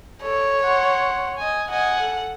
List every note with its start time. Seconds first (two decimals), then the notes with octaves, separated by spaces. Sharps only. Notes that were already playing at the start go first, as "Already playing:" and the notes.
0.22 A4 C#5
0.63 F#5 C6
1.37 D#5 G#5
1.70 D#5 F#5 G#5
2.00 A4